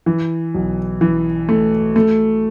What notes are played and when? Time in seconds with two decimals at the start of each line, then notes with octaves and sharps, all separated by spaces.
0.06 E3
0.54 B1
1.01 E3
1.49 A3
1.96 A3